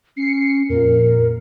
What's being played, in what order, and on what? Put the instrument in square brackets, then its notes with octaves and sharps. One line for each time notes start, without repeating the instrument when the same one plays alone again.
[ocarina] C#4 [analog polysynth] C7 C#7
[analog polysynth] F2 A#2 [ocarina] A#4